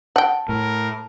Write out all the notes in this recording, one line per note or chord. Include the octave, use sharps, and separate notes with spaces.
F#5 G5 A5
A2 A#4